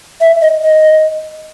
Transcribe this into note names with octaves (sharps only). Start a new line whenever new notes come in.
E5
D#5
D#5